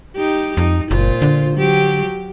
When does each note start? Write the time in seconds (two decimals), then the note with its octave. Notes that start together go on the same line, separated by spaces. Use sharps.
0.16 D#4 G4
0.57 F2 D#4
0.91 F#1 A#2 F4 C5
1.22 D3
1.56 F#3 G4